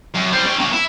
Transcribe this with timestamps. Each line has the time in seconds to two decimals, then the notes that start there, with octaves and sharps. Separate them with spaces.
0.15 F#2
0.32 G3 C5
0.46 C#4 G5
0.59 A#3 C#4
0.73 E4